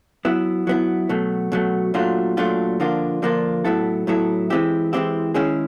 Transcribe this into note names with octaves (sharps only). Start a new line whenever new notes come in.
F#3 B3 E4
F#3 B3 E4
B2 F#3 A3
B2 F#3 A3
A#2 F#3 A3 D4 F4
A#2 F#3 A3 D4 F4
D3 F3 A#3 D4 F4
D3 F3 A#3 D4 F4
A2 F#3 B3 E4 A4
A2 F#3 B3 E4 A4
E3 G#3 C4 E4 G4
E3 G#3 C4 E4 G4
D#3 G#3 C#4 E4 G#4